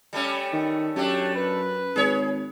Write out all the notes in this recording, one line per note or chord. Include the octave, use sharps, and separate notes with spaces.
G3 A3 C#4
D#3
F#2 A3 D4 G4 C#5
B4
G#1 G#4 C#5